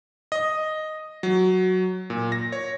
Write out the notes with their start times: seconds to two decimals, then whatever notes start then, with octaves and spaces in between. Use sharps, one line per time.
0.32 D#5
1.23 F#3
2.10 A#2
2.32 A#6
2.52 C#5